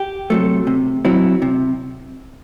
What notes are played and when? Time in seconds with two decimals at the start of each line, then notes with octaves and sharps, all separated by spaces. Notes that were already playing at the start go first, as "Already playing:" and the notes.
Already playing: G4
0.30 C3 F#3 A3
0.67 C3
1.05 F#3 C4 E4
1.42 C3